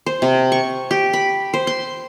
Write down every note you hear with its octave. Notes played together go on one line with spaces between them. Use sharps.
C5
C3
C#6
G4
B5
C5
C6